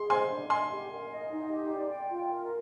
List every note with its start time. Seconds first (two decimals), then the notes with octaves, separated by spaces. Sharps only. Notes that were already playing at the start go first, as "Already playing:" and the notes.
Already playing: G#4 C6
0.10 C5 G#5 C6
0.30 D4
0.50 D4 G#5 C6
0.70 G4
0.90 A#4
1.10 D#5
1.31 D#4
1.50 G4
1.71 D5
1.90 G5
2.10 F4
2.31 A#4